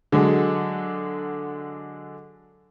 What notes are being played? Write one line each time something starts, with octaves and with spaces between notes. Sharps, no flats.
D3 F#3 G#3